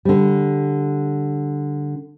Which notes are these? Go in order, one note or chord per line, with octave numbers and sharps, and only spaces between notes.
D3 G3